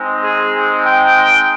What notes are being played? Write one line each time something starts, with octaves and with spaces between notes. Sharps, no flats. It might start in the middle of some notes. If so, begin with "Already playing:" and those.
Already playing: G#3 C4 D#4
G#4
G5